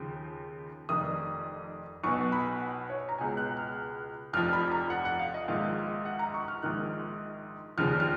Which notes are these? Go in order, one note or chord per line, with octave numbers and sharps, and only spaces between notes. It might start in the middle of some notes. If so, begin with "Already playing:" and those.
Already playing: D#2 C#3 F3
F1 F2 D#3 D#6
B1 B2 C#6
B5
C#5
A#5
C#2 B2 G#5
F#6
F6
F1 F2 F3 F6
B5
A#5
F#5
F#5
F5
D#5
A#1 G#2 D#3 F5
F#5
A#5
C#6
F6
A#1 G#2 D#3 F#6
F1 D#2 C#3 F3 F6
F6